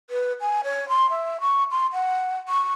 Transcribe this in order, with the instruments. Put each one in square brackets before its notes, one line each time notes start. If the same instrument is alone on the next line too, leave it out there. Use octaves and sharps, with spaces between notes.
[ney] B4
G#5
C#5
C6
E5
C#6
C6
F#5
C#6